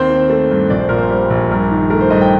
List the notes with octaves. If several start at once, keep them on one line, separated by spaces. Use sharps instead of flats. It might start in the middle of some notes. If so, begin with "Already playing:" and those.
Already playing: D#2 C4 C5
D#3
A3
G2
A#1 D5
C5
A#2 A#4
C5
G3 C5
A#1
G2 A#4
D#3
A3 A#4
C5
G2 D#5
G5